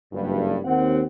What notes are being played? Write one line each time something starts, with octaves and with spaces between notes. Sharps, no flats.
F#1 G2
D#2 C4 F#5